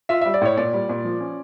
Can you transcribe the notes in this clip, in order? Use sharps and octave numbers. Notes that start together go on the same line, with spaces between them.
F4 E5
G3 E5
D5
A2 C#5
A#2 D5
G3
A#2
F3
C#4